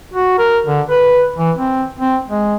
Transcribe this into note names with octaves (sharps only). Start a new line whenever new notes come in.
F#4
A#4
D3
B4
E3
C4
C4
G#3